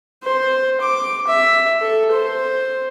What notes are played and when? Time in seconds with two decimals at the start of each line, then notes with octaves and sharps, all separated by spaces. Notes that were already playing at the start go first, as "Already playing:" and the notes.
0.23 C5
0.81 D6
1.27 E5
1.81 A4
2.12 C5